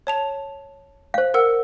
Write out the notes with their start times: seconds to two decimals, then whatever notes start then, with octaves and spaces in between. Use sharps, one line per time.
0.07 C#5 A5 F7
1.14 C5 F5
1.34 A#4 F#5 E6